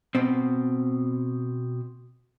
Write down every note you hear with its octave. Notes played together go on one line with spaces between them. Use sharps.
B2 C4